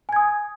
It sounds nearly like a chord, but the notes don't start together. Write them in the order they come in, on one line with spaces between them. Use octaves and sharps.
G#5 G#6 D#6